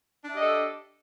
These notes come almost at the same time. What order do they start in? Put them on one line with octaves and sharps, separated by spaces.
D4 E5 G4 D#5 A4